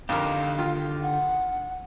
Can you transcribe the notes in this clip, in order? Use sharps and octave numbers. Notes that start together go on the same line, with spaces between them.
F2 D3 D#4 G4 A#4 F5
D#3 F4
F#5